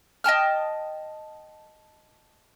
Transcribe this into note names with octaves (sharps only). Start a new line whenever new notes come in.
D#5 G5 A5 F6